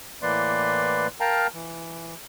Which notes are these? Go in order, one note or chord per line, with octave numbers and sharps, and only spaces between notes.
A2 E3 A#3 B4 D5 C6
A#4 F5 G5 A5 A#5
E3